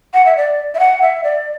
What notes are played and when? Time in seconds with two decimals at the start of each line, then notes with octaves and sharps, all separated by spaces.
0.14 F#5
0.26 E5
0.37 D5
0.74 E5
0.79 F#5
1.02 E5
1.24 D5